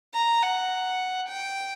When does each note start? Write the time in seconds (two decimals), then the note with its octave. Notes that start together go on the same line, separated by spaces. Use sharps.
0.14 A#5
0.43 F#5
1.29 G5